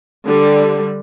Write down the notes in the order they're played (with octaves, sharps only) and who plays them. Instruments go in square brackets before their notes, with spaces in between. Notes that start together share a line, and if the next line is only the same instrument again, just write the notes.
[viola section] D3 G3